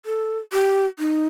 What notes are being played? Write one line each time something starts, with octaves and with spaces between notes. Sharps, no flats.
A4
G4
D#4